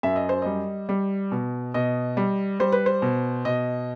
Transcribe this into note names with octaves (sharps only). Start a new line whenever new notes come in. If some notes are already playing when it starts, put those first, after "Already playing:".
F#2 E5
D#5
C5
G3 D#5
G3
B2
B2 D#5
G3
G3 C5
B4
C5
B2
B2 D#5